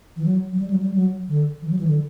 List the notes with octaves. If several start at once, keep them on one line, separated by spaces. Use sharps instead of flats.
E3
F#3
F#3
G3
F#3
G3
F#3
D3
E3
F#3
E3
D3